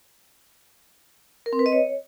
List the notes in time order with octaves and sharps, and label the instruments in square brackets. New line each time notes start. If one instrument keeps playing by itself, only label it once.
[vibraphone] A#4
C4
B4
D#5
C#5